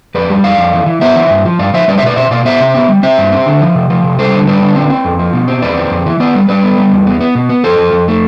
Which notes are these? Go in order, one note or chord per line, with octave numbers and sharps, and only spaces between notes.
F2 B4 D5
G3
F2 D5 F5
F2
E3
E3
B3 C5 E5
E3
G2
F3
G2 D5 F5
F3 C5 E5
G3 B4 D5
C5 E5
B2 B4 D5
B2 C5 E5
B2 D5 F5
B3 C5 E5
C3
B3
G3
C4 C5 E5
G2
C4
D3
F3
C3
F3
C3
G3 A4 C5
D3
G3 B4 D5
D3
C4
C4
F2
F3
B2
C4
E2 B4 D5
C4
F2
E3
B3 B4 D5
G3
G3 B4 D5
B3
G3
E2
B3
B3
B2
B3
F2 A4 C5
F2
F2
A3